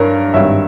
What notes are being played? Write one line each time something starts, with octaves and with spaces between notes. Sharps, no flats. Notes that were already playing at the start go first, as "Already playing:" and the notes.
Already playing: G2 A#4 C#5
G#1 G2 D#3 C#5 E5